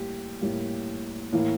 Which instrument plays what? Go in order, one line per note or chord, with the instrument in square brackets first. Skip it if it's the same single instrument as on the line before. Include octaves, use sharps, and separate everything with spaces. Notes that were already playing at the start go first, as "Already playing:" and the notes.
Already playing: [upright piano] A2 G3 A#3 G4
A2 G3 A#3
A2 E3 A#3